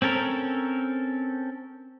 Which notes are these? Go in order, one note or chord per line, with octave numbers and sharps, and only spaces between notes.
C4 C#4 A4 A#4